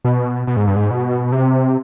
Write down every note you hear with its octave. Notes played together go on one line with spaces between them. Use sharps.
B2
B2
G#2
G2
G#2
B2
C3